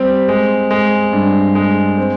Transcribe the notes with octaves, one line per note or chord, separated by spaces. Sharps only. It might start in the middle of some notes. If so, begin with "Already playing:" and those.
Already playing: G3 C4 G4
G#3
G#3
G2
G#3
C4